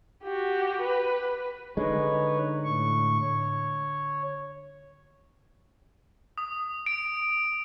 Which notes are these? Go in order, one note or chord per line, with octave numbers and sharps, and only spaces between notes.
F#4 G4
B4
D3 G#3 D#4 B4 C#5
A2 C#6
C#5
D#6
D7